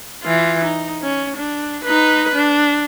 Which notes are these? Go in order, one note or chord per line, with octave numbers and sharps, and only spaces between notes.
E3 F4
D#4
C#4
D4
D#4 B4
D4